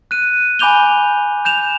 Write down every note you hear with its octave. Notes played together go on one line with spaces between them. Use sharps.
F#6 D#7
G#5 B5 D6 G6 F7 G7
G6 E7 F7